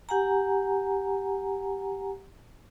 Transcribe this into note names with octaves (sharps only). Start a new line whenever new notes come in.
G4 F#5 G#5 A#5